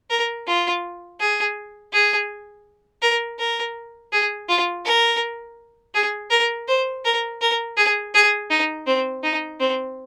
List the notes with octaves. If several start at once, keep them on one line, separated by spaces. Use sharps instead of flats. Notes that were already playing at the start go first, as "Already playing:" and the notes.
A#4
F4
G#4
G#4
A#4
A#4
G#4
F4
A#4
G#4
A#4
C5
A#4
A#4
G#4
G#4
D#4
C4
D#4
C4